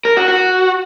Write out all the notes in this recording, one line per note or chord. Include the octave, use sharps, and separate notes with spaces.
A#4
F#4
F#4